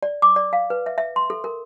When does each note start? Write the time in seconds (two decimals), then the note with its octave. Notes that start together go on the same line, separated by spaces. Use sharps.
0.03 D5
0.22 D6
0.36 D5
0.53 F5
0.70 B4
0.86 E5
0.98 E5
1.16 C6
1.30 A4
1.44 A#4